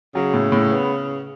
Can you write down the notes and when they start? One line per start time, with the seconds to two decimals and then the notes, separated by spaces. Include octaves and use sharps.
0.15 C#3 F#3
0.33 A2
0.52 A2
0.71 B3